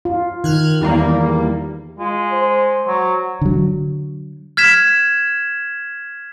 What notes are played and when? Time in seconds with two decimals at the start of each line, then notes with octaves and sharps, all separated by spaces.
0.05 F4
0.44 D#3 F6 F#6 G#6
0.81 E2 G3 A#3
1.99 G#3 F4
2.32 C5
2.88 F#3
3.41 D3 F#3
4.57 F6 G#6 B6 E7